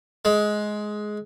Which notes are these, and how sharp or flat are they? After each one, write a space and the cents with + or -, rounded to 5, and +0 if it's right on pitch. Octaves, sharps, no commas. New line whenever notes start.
G#3 +15